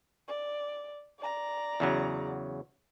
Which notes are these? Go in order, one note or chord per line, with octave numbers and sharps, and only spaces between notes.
D5
D5 A#5
E2 C#3 F#3